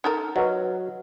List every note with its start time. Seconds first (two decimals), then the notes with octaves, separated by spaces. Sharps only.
0.04 D#4 A4 A#4
0.36 F#3 F#4 B4 D#5